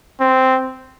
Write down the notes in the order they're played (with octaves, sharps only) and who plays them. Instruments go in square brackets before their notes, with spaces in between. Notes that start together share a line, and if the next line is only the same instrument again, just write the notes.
[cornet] C4